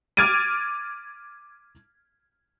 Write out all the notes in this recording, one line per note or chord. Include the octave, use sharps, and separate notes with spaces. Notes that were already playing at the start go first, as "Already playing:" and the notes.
D6 F6 G#6 A6 D7 D#7